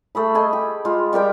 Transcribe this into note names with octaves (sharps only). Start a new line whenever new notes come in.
A3 G#4 B5
A4 D#5 G#5 B5
G4
G#3 F4
G3 G4 A#4 G5